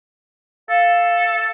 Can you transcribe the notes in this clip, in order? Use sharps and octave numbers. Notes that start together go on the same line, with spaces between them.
A4 F5